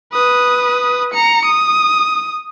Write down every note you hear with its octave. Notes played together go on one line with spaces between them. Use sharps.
B4 D#6
A#5 C#7
D#6